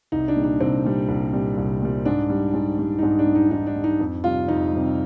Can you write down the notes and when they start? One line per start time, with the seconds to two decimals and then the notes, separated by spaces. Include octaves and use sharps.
0.12 C2 D#4
0.28 D4
0.36 A#2 G3
0.44 D4
0.60 C2 C4
0.84 A#2 G3
1.08 C2
1.33 A#2 G3
1.57 C2
1.82 A#2 G3
2.06 G#2 D4
2.30 G3
2.54 G#2
2.79 G3
2.99 D#4
3.03 G#2 D4
3.19 D4
3.27 G3
3.35 D#4
3.51 G#2 D#4
3.67 D4
3.76 G3
3.84 D#4
4.00 F2
4.24 C3 G3 F4
4.48 F2 D#4
4.73 C3 G3